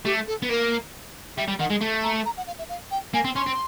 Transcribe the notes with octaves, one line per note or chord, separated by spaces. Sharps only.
A3 G4
A4
B3
A#3 A#4
G3 E5
G3
D#3 F#5
G#3
A3
A#5
A#5
F#5
F5
E5
F5
G5
A#3 G#5
C4
C#4 C6
C4